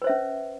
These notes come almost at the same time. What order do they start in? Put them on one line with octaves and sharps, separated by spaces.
B4 C5 E5 C#4